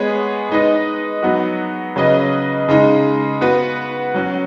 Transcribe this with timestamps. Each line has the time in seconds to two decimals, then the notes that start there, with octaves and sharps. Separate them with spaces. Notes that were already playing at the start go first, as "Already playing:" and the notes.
Already playing: G#3 B3 G#4 C#5
0.49 G#3 D#4 B4 D#5
1.23 F#3 B3 D#4 F#4
1.96 C#3 F#3 C#4 B4 D#5
2.69 C#3 G#3 D#4
3.41 B3 F#4 B4
4.14 F#3 C#4 F#4